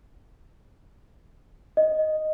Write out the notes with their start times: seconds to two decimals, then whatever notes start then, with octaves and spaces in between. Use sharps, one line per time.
1.77 D#5